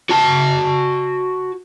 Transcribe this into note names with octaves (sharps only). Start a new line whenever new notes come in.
F#4 A5